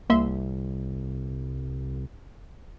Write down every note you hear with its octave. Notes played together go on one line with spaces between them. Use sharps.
C2 A#3 E5 C6